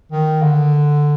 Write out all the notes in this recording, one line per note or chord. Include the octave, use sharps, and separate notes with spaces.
D#3
D3